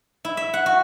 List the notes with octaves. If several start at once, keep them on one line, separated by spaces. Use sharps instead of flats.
E4
E5
F#5
F#4